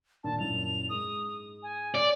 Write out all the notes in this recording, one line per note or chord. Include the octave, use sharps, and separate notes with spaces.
D#2 A#2 D3 A5
F#2 A#2 E4 F7
G#2 G#3 D#6
G#5
D5